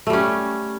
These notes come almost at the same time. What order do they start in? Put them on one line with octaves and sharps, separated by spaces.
A3 G3 C#4